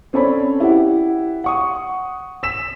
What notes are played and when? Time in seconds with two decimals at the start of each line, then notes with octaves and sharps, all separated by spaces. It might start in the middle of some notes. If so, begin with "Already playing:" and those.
0.13 C4 C#4 A4 C#5 D5 B5
0.60 E4 G4 F#5
1.44 F#5 C#6 D#6
2.43 E6 B6 E7